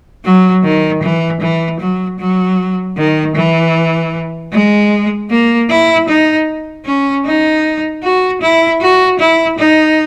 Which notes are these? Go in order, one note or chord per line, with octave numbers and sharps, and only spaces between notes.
F#3
D#3
E3
E3
F#3
F#3
D#3
E3
G#3
A#3
E4
D#4
C#4
D#4
F#4
E4
F#4
E4
D#4